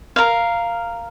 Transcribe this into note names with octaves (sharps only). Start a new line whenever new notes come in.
A#4 F5